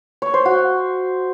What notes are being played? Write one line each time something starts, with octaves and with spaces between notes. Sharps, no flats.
C#5
C5
F#4